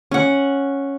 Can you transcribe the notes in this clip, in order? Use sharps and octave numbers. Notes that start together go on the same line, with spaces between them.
C#4 F#5